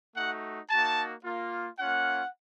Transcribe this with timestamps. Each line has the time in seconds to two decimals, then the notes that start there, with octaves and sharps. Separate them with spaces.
0.16 A3 D#4 F#4 F#5
0.70 A#3 D#4 F#4 A5
1.24 A#3 F4
1.79 A#3 C#4 F4 F#5